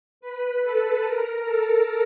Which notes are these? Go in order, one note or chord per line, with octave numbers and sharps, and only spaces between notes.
B4
A4
A#4
A4